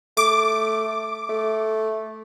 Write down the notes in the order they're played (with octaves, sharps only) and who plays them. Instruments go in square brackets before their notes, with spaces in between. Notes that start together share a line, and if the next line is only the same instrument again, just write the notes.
[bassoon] A3 [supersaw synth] D6
[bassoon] A3